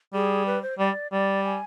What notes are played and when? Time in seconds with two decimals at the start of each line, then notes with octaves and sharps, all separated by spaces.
0.14 G3 G#4
0.46 B4
0.63 C5
0.79 G3 D5
1.12 G3 D5
1.44 G#5